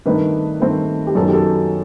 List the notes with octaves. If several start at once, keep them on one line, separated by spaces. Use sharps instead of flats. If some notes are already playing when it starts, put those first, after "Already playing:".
G2 D#3 A3 C4 B4
G2 D#3 A3 C4
G4
F#2 D#3 F#3 B3 A4
G4
A4